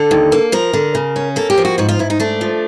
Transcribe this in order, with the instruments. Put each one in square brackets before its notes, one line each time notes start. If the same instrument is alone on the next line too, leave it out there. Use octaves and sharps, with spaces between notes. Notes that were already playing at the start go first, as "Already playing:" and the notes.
Already playing: [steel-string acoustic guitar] D3 A4
D#2
A#3
F3 A#4
D3
C#3
C#4
A#3 A4
G4
F3
F#4
G#2 F#4
F4
G#2 E4
D#4
A3 D4
F3